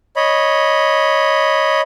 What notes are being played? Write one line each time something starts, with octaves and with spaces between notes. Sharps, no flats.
C#5 D#5 B5